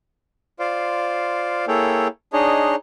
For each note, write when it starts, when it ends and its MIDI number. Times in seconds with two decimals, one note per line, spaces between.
0.59 1.65 65
0.59 1.65 72
0.59 1.65 74
0.59 1.65 77
1.68 2.08 58
1.68 2.08 64
1.68 2.08 68
1.68 2.08 69
1.68 2.08 73
1.68 2.08 79
2.33 2.75 62
2.33 2.75 63
2.33 2.75 68
2.33 2.75 73
2.33 2.75 75